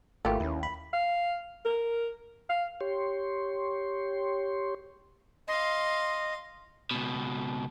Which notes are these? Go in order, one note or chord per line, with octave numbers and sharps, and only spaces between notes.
G#1 E3 A3 A#3 F4 G4
D#2 C#4 E4
B5
F5
A#4
F5
G4 C#5 C6
D#5 F5 C6
C#2 B2